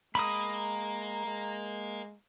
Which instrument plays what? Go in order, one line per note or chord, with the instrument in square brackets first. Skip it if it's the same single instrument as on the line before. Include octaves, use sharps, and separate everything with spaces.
[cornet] G#3 [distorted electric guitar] A#3 [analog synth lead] A#5 [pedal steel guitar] B5 D#6
[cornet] G#3